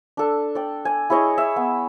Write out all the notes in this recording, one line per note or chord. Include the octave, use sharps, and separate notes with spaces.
D4 A4
D5 G5
G#5
E4 G#4 C#5 D#5
E5
B3